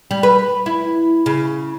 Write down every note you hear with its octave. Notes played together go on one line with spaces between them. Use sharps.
G3
B4
E4
C#3